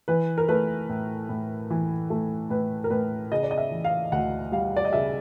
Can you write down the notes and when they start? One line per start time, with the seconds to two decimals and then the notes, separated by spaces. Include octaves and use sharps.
0.08 E3 B4
0.38 A#4
0.48 A3 B4
0.89 A2
1.29 A2
1.70 E3
2.10 A3
2.50 A2 B4
2.84 A#4
2.90 A2 B4
3.32 C#3 D#5
3.43 D5
3.51 D#5
3.58 E5
3.71 E3
3.85 F5
4.12 D2 F#5
4.52 G3 F5
4.77 D5
4.85 D#5
4.93 C#3 E5